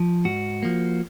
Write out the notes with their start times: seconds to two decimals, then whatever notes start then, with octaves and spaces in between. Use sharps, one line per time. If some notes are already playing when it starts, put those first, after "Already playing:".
Already playing: F3
0.25 G#2 F#4
0.63 F3 A#3